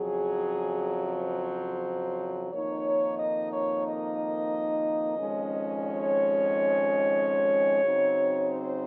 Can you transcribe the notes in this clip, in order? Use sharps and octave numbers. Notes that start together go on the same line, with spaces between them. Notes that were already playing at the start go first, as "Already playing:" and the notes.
Already playing: F2 C#3 F#3 G#4
C5
F2 D#3 A#3 D#4 C#5
D#5
C#5
D#5
F2 D#3 G#3 C#4
C#5
C#3 F#3 C4 D#4
C5